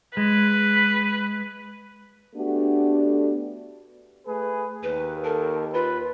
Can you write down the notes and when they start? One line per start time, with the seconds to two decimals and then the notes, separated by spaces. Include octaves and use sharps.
0.17 G#3 B4
2.35 A3 B3 D4 F#4 G4 A4
4.26 A3 G#4 B4
4.83 D#2 B4
5.24 A4 A#4
5.74 F4 B4